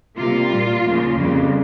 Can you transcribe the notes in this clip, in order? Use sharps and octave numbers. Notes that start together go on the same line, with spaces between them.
C3 G3 A#3 F4
A#2 G3 A#3
D#2 C#3 F3 A#3
F2 C#3 G3 A#3